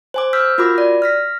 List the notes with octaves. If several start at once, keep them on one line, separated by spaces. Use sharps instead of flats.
C5 G#5 D6
E6 F6 G6 B6
F4 F#4 A#4 B5 D6 A#6
D5
F6 A#6 B6